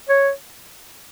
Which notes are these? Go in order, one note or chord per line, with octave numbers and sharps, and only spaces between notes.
C#5